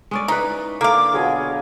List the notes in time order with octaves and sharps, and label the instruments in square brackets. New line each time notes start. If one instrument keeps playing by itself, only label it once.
[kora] G#3 C#4 D5
[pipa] D#4 [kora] E4 B4
[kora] D3 D5 [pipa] A#3 F5 [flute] D6
[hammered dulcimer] B2 F#3 F4 [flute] G#4